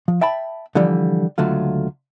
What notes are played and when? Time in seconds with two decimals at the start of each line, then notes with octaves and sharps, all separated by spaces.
0.08 F3
0.21 E5 G5 A5 B5
0.75 D3 E3 F3 G3
1.38 C#2 D3 F#3 A3 F4